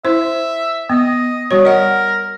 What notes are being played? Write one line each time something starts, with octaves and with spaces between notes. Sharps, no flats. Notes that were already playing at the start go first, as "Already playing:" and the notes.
E4 C5 E5
B3 D#5
G3 F#4 C#5
A#4 D#5 F#5